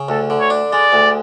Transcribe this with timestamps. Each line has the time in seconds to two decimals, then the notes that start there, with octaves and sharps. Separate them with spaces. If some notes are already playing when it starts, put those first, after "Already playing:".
Already playing: C#3
0.09 D2 A4
0.30 D3
0.40 C#5
0.50 D4
0.72 G#3 D5
0.92 D2